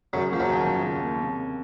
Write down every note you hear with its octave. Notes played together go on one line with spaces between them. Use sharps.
F#2 C#3 F#3
F3 A#3
F#2 F#3
D#2
F3
C#3
A#3
C3